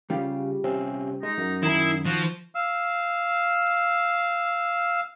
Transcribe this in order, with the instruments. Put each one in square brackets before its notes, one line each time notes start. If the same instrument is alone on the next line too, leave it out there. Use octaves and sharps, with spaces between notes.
[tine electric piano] C#3 [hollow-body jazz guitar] G3 F4 G4
[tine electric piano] C3 C4 C#4
[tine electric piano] G#3 [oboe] D#4
[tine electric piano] F#2
[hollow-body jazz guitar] D#3 A#5 [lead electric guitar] E4 [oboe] G#4
[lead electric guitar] F3 [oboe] F#4
[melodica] F5 E6